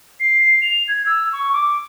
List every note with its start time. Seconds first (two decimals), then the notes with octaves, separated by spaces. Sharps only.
0.20 C7
0.62 F7
0.88 G#6
1.06 E6
1.33 C#6
1.53 D6